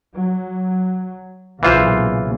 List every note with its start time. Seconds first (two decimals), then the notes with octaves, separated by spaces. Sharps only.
0.15 F#3
1.63 B1 A#2 C#3 E3 F4 C5